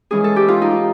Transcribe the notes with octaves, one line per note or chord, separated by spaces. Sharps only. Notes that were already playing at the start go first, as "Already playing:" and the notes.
E3 G#3 C#4 G#4
A4
G4
F4
D#4